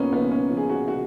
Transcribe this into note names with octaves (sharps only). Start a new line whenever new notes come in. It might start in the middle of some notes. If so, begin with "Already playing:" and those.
Already playing: A#1 A#2 A#3 B3 C#4
A#1 B3
C#4
F3
G#4
F#4
F#4